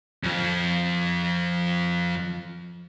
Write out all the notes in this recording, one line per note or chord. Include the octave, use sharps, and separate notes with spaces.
F2 F3